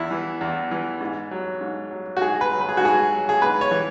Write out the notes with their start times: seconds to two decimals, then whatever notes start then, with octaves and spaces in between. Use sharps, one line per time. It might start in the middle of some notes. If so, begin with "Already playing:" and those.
Already playing: E2 E4
0.11 E3
0.41 E2
0.71 E3
1.01 G#2
1.31 F#3
1.61 G#2
1.90 F#3
2.17 F#4
2.21 G#2 G#4
2.41 B4
2.52 F#3
2.61 B4
2.69 G#4
2.77 F#4
2.81 G#2 G#4
3.11 F#3
3.29 G#4
3.42 G#2 B4
3.61 C#5
3.71 E3